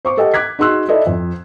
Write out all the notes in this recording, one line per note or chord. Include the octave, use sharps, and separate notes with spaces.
C5 C#6 D6
G4 A4 D#5 F#5 G5
D6 F#6 G#6 B6
D#4 F#4 G#4 C6 E6 F#6
E4 A4 D5 D#5
F2